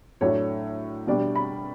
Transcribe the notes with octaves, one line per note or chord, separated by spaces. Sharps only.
A2 F#3 A3 D4 C#5
B2 G3 D4 D5
B5